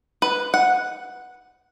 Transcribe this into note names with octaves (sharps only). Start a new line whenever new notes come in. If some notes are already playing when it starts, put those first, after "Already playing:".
B4
F#5